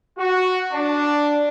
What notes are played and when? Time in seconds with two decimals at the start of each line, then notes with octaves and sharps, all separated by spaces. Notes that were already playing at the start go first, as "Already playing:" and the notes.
0.17 F#4
0.72 D4